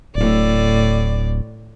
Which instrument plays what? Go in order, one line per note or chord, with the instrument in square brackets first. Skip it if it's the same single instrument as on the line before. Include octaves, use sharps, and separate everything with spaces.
[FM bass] D1 [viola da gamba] A2 D5